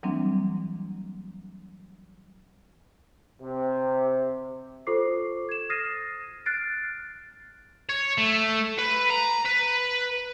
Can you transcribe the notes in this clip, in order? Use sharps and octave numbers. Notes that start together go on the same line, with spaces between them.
E3 F#3 G3 A#3 C4 D4
C3
F4 A4 C5 C#6 D6 C7
G#6 E7
D#6 F6 A6 A#6 C7 D#7
F6 F#6 A6 C7 D7
C#5
A3
B4
A#5
B4